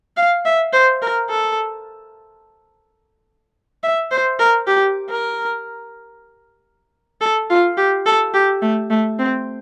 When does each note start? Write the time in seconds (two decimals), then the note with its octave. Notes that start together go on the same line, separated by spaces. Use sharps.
0.17 F5
0.46 E5
0.73 C5
1.02 A#4
1.30 A4
3.83 E5
4.11 C5
4.39 A#4
4.67 G4
5.10 A#4
7.21 A4
7.50 F4
7.77 G4
8.06 A4
8.34 G4
8.62 A3
8.90 A3
9.19 C4